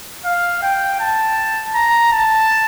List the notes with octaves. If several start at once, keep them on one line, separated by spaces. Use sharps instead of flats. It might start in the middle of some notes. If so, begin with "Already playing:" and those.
F5
G5
A5
A#5
A5